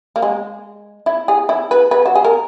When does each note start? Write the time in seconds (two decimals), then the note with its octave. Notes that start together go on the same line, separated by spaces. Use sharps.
0.16 A#3
0.22 G#3
1.06 E4
1.28 G#4
1.49 E4
1.71 B4
1.91 B4
2.06 F#4
2.15 G#4
2.24 A#4